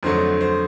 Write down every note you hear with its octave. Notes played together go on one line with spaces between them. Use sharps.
F2 D3 F#3 A3 C5
C5